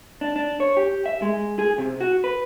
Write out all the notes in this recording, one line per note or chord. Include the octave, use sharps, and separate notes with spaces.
D4
D4
C#5
G4
E5
G#3
G#4
C3
F#4
B4